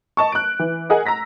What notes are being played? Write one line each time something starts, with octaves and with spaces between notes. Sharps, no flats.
D#5 A5 C#6
F#6 D7
E3
G#4 A#4 D#5 F#5
A#5 E6 A#6 B6